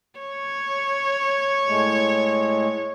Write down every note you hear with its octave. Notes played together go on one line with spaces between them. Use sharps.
C#5
A2 G#3 A3